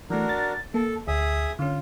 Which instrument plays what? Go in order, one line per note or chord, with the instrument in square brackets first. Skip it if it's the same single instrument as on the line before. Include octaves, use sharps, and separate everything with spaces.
[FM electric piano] E3 A3 [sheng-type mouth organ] D4 F#4 A#4
[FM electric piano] A6
[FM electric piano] A#3 [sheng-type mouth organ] A4
[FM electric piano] D2 [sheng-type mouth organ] G#4 E5 D#6
[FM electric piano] D3 C#4 [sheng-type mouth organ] F4